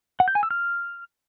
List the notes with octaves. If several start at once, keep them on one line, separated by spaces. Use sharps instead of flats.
F#5
G6
G#5
E6
F6